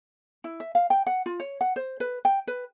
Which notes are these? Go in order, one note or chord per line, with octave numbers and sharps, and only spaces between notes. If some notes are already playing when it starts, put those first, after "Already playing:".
E4
E5
F5
G5
F#5
F4
C#5
F#5
C5
B4
G5
B4